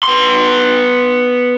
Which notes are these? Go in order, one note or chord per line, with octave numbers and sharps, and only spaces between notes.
B3 C6